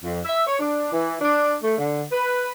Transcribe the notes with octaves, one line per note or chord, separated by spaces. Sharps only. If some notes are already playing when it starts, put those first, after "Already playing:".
F2
E5
C#5
D4
E3
D4
A3
D3
B4